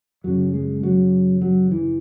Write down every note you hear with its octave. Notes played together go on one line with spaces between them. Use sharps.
F#2 C#3 F#3
G#3
F#3
F#3
E3